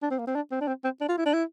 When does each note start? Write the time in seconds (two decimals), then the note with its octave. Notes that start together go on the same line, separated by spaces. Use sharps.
0.03 D4
0.11 C4
0.19 A#3
0.27 C4
0.36 D4
0.52 C4
0.61 D4
0.68 C4
0.84 C4
1.01 D4
1.09 F4
1.18 E4
1.26 D4
1.34 E4